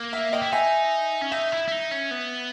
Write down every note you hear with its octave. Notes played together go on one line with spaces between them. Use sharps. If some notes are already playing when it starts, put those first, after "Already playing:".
Already playing: A#3
E5
D#5 G5
E4
D#4 E5 G#5
C#4
D#4 E5
E4
E4
D#4
C#4
B3